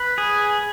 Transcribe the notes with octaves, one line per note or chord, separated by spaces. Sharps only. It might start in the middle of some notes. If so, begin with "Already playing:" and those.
Already playing: B4
G#4